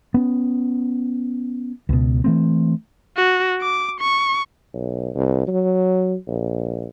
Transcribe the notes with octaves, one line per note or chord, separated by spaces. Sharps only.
B3 C#4
C#2 B2
E3 A3 C4
F#4
D6
C#6
B1
C2
F#3
A#1